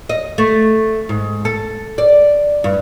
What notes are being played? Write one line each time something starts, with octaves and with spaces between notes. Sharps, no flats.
D#5
A3
G#2
A4
D5
G2